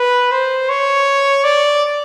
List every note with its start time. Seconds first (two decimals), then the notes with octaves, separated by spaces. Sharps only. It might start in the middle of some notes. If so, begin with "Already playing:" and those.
Already playing: B4
0.32 C5
0.69 C#5
1.44 D5